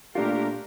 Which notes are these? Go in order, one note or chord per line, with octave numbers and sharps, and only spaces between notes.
A#2 A3 D4 F4 G4 A#4